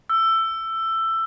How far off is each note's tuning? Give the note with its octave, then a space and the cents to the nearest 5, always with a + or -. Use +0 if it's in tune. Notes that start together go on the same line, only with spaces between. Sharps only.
E6 +15